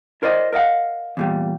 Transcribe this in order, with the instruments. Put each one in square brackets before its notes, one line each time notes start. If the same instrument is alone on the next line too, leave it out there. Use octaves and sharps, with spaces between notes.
[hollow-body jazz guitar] E4 A#4 C5 D5 D#5
A#4 D#5 F5 F#5
E2 A#2 G3